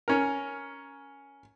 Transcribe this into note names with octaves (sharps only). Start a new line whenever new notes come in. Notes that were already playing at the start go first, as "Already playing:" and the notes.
C#4 A#4